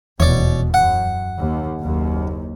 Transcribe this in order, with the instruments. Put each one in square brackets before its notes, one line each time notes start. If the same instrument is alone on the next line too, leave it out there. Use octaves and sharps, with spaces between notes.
[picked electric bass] D#1 E2 [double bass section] B2 [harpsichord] C#5 D5
[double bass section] F#2 [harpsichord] F#5
[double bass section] D#2
F#1 D#2